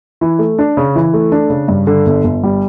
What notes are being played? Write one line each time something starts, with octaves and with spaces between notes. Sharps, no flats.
E3
A3
D4
C#3
E3
A3
D4
C#3
G2
D3
G1
G1
G3